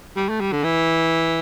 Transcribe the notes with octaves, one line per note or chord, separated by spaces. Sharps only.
G3
A3
G3
D3
E3